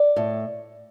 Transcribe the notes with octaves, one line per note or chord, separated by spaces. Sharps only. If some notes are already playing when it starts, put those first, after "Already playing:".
Already playing: D5
A2